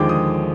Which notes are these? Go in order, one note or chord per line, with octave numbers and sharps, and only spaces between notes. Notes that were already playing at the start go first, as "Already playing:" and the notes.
Already playing: D#2 D3 F3 G#3 G5 D6
D#6